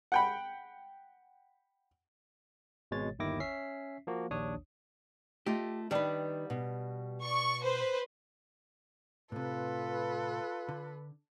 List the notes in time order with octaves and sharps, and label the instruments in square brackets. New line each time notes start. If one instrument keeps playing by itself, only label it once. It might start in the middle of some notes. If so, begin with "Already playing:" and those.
[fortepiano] F#5 G5 B5
[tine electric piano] G#1 B2 G#3 C#5 A6
G1 D#2 D#3 E4 D6 A#6
C#4 E5 B6 C7
F3 A#3 F#4
A#1 D#2 D4 C#5 D#6
[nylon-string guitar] A3 F4 D#5 [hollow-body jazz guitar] G4
[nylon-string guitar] D#3 B4 [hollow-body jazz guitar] G3 D4
[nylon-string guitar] B2
[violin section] D5 C#6
B4 C5
[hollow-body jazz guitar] A2 C3 [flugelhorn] F4 [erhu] A4 [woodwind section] B4
[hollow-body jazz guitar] D3